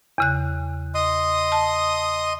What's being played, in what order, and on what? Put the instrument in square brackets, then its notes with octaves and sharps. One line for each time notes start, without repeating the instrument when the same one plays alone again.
[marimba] E2 C#3 F#6
[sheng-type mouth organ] D#5 C6 D#6
[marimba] A5